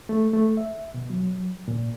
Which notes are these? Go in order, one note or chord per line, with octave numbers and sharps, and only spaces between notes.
A3
A3
E5
B2
F#3
A#2